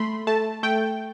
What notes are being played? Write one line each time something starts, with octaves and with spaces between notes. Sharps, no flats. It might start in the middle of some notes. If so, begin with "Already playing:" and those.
Already playing: A3 B5 C6
A3 A5
A3 G5